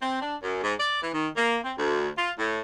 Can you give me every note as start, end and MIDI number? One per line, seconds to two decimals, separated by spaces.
0.02 0.20 60
0.21 0.35 62
0.42 0.60 42
0.63 0.74 44
0.79 1.00 74
1.02 1.11 52
1.14 1.28 51
1.37 1.57 58
1.63 1.72 60
1.78 2.09 38
2.16 2.30 65
2.38 2.60 45